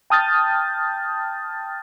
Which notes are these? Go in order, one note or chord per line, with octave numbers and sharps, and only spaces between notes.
G5 A5 D#6 F6 G6 A6